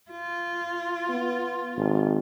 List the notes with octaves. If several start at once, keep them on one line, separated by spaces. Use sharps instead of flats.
F4
B3
G#1